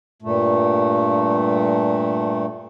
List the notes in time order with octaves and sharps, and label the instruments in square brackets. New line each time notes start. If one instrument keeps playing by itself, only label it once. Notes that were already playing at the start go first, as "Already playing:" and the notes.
[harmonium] G2 A#2 A3